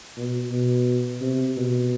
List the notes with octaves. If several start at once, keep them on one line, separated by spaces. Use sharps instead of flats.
B2
B2
C3
B2